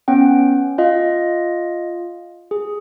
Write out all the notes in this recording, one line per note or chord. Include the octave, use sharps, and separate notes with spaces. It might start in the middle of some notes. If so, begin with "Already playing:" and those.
B3 C#4 G5
F4 D#5 F5
G#4